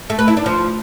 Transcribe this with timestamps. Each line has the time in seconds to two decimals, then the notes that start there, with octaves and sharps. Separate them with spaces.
0.10 A3
0.19 B4
0.28 E4
0.37 D4
0.46 F3